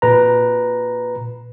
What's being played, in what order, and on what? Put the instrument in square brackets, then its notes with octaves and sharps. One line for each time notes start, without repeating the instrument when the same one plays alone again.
[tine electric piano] A#2 B4 A#5